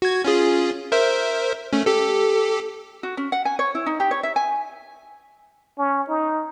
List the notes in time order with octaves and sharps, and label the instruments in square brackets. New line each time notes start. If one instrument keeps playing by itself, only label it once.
[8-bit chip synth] F#4 G#6
C#4 F4 G#4
A#4 C5 E5
A3 C#4
G4 A4
[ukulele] F#4
C#4
F#5
G#5
C#5
E4
D#4
G4
C#5
E5
G#5
[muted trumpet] C#4
D#4